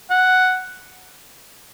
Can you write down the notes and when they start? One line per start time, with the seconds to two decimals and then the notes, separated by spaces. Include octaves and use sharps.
0.10 F#5